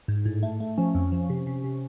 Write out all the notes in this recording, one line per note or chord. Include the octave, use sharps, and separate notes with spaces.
G#2
A2
A3
A3
F3 C#4
F2
F3
C3
C3
C3